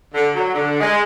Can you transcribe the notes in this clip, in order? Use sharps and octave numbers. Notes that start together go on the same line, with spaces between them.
D3
F#3
D3
G#3